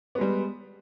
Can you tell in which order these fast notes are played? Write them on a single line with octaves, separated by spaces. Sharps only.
B3 G#3 G3